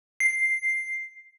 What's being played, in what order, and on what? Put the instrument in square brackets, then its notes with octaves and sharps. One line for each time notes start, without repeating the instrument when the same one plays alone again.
[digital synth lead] C7